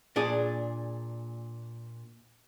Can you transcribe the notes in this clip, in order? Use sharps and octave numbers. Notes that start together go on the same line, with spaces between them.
A#2 D4 G#4